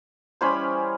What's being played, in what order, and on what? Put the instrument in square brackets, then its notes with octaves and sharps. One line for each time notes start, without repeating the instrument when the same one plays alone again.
[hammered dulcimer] E3 G3 C#4 [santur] C5 G#5 B5